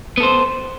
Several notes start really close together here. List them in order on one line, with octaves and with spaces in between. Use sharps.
B3 A4 C5